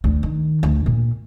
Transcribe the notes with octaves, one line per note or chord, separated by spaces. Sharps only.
D2
D#3
D2
A#2